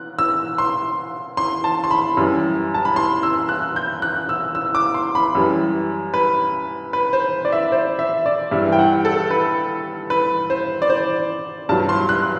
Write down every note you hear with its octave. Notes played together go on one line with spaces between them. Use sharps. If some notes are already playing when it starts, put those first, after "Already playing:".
Already playing: F#6
E6
C6
C6
A5
C6
B5
F#2 E3 G3
A5
B5
C6
E6
F#6
G6
F#6
E6
E6
D6
C6
B5
F#2 E3 G3
B4
B4
C5
D5
E5
C5
E5
D5
G2 E3 G3 E5
G5
F#5
A4
B4
B4
C5
D5
C5
G2 F#3 A5
C6
F#6